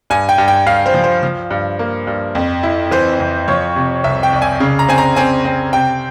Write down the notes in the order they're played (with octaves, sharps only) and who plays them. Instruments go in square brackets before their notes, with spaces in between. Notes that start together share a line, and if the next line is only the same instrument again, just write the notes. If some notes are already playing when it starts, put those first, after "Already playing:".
[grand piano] G2 G#5
G5
G2
G5
G2 F5
C5
F3
C5
F3
G2
A#3
G2
F2
E4
E3 C5
F2
F3 C#5
C3
C2 E5
G5
C2
G#5
C#3
A#5
C4 G#5
A#5
C4 G#5
C4
C3 G5